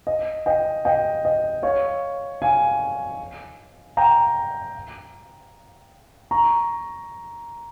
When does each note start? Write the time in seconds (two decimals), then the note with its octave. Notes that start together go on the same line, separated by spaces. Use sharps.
0.07 D#5
0.46 D#5 G5
0.85 D#5 G5
1.25 D#5
1.63 C#5 F5
2.42 F5 G#5
3.97 G5 A#5
6.31 A#5 C#6